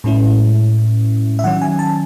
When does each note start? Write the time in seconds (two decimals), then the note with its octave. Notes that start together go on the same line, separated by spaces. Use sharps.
0.04 A2 G#3 C#4 E4
1.39 E5
1.44 D#3 F#3 C#4 F#5
1.62 G#5
1.79 A5